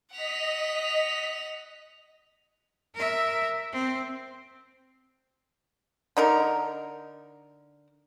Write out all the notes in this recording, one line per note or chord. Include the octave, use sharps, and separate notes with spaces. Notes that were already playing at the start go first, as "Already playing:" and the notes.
D#5 F#5 B6 F7
A#4 E5
C4
D3 D#4 A#4